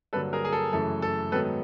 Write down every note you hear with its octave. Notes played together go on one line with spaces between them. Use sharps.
G2 D3 F#3 A#3 A4 B4
G#4 A#4
G#4
A4
F#2 C#3 E3 A3 A4
A4
G#2 D#3 F#3 B3 A4 B4